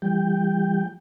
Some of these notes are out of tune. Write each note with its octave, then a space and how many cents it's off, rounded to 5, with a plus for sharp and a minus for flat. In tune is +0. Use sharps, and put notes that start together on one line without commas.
E3 +45 G3 +25 G5 +0